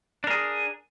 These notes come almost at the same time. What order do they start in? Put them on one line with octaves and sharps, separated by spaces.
D4 A#4 G#4